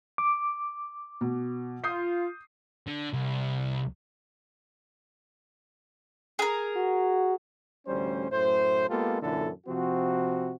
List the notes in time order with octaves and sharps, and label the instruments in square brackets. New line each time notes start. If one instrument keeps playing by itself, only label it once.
[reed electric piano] D6
[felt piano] B2
[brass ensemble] F4 [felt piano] D#6 G6 C7
[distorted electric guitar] D3
C2
[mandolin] G#4 A#4
[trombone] F#4
[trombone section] A1 D2 G3 C#4 C5
F#2 A2 A3 C5
G#3 A#3 B3 F4 G4 A4
F#2 A#2 D3 E3 E4 A4
C3 F3 C4 F#4